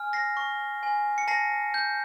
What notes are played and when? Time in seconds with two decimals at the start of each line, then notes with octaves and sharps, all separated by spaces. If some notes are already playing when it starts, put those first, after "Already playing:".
Already playing: G#5 F6
0.13 A#6 C7
0.37 C#6
0.83 G#5
1.18 C#7
1.28 A5 A#6 C7
1.74 G6